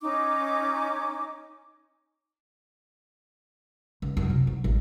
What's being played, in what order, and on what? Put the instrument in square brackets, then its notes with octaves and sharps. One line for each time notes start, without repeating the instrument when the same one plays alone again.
[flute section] C#4 D#4 D6
[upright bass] C#2
F#2
C3
F#3
A1